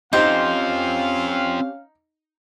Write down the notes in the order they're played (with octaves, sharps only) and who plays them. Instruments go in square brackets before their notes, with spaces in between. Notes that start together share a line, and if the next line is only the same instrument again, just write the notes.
[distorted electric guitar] C4 F4 [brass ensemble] C#4 F5 [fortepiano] D#4 [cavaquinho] G4 C5